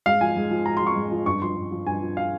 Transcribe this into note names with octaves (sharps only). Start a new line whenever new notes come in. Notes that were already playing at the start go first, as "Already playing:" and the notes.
G#2 F5
F3 G#5
G#2
F3
G#2 A#5
C6
F3
C#6
G#2
F3
G2 C#6
F3 C6
G2
F3
G2 G#5
F3
F5